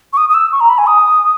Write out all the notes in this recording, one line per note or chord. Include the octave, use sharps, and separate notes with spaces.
C#6
D#6
D#6
E6
C#6
A#5
B5
G#5
D#6